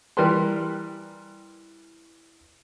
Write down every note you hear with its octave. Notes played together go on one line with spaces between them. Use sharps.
E3 G3 A#4 B4 C6